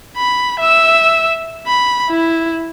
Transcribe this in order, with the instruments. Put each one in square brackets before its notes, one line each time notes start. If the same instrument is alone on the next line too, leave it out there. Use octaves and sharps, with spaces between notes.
[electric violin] B5
E5 E6
B5
E4